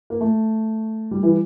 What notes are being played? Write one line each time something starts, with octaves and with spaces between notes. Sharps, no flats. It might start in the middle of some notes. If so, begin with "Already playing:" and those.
A#3
A3
G3
E3